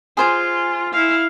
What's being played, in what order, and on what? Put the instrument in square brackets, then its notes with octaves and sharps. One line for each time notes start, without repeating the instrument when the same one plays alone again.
[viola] F4 [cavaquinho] G#4 C5 G#5
[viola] E4 F5